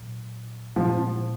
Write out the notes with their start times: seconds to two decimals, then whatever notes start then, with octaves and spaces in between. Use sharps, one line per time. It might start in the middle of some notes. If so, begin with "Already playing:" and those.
Already playing: A#2 F#3
0.76 A#2 F3 G#3